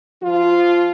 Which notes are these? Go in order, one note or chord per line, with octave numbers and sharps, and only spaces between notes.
F3 F4